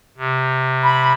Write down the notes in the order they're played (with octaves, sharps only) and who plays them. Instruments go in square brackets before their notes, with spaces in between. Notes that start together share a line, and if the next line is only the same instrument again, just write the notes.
[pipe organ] C3
[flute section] B5